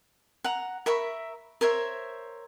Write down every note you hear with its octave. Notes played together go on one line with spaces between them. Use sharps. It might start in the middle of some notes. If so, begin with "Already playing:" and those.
F#5 A#5
A#4 E5 B5 C#6
A#4 C5 C#5 E5